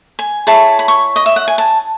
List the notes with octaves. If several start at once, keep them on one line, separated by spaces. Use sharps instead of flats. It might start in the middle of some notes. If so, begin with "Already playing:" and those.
G#5
E4 G#4 C#5 A5
B5
C#6
D#5
E5
F#5
G#5
A5